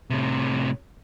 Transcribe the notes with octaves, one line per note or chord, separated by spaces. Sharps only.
A2 C3